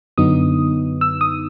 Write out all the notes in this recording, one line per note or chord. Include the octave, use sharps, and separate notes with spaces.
F#2 D3 F#3 B3 D#4 D#6
E6
D#6